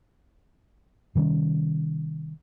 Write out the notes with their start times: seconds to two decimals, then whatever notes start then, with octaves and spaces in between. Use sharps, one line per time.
1.15 C3 D#3 G3 C#4